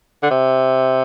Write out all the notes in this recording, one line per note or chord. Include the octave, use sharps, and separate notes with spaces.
D3
C3